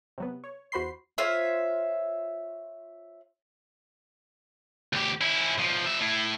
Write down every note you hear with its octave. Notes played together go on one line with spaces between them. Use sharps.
C3 F#3 B3
C#5
E2 F#4 C5 B5 C6 C7
F4 C5 C#5 E5
D2 G4
C#4 E4
B1 F3
F3 E5
A3 E4